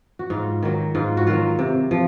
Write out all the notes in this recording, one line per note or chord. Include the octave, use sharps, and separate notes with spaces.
F#4
G#2 F4
D#3 F#3
G#2 F4
F#4
D#3 F#3 F4
C3
F3